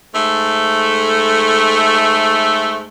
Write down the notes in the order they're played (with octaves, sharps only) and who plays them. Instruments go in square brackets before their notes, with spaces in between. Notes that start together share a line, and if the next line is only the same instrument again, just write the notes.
[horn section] G#2 A3